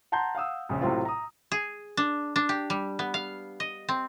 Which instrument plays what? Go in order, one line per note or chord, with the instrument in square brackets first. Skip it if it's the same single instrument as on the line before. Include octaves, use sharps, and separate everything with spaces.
[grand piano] F#5 A5 A#5 C6 G6
F5 F#5 D#6 E6
A#1 C#3
A2 C3 F#3 C4 F4
A#5 D#6
[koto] G#4
D4
D4
G4
G3
B3
F5
D#5
C4